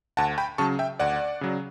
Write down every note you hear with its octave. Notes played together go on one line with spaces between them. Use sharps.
D2 F#5 A5
G5 B5
C#3 F#3 A5 C#6
E5 G5
D2 D5 F#5
C#3 F#3